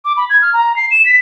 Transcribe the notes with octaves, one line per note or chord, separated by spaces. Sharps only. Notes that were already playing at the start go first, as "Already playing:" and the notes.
D6
B5
G#6
F6
A#5
C7
E7
B6